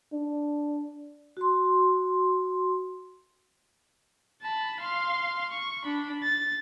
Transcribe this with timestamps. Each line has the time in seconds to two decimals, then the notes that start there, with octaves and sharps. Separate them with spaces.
0.13 D4
1.37 F#4 C6
4.42 A5 B5
4.81 F5 C6
5.51 C#6
5.84 D4 B5
6.23 A6